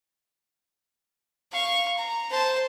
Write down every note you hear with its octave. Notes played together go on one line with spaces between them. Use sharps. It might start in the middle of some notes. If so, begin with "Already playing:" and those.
F5 C#6
A#5
C5 A5